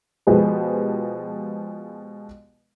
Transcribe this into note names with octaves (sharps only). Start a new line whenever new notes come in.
B2 F3 G#3 G4 G#4 B4